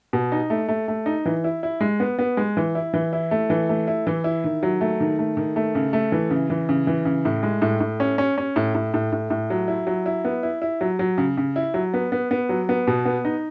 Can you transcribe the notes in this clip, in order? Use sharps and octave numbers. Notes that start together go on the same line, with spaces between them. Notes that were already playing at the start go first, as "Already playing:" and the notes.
B2
D#4
A3
A3
A3
D#4
E3
E4
E4
G#3
B3
B3
G#3
E3
E4
E3
E4
A3
E3
A3
E4
E3
E4
D#3
F#3
A3
D#3
A3
D#3
A3
C#3
A3
E3
C#3
E3
C#3
E3
C#3
A2
G#3
A2
A2
C#4
C#4
C#4
A2
A2
A2
A2
A2
F#3
E4
F#3
E4
B3
E4
E4
F#3
F#3
C#3
C#3
E4
F#3
B3
B3
B3
F#3
B3
B2
B3
D#4